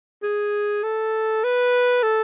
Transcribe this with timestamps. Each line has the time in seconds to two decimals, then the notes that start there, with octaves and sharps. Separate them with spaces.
0.23 G#4
0.83 A4
1.44 B4
2.03 A4